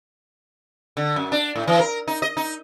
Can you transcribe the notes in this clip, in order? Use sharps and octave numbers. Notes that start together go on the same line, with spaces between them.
D3
F#2
D4
A2
E3
A#4
D#4
D#5
D#4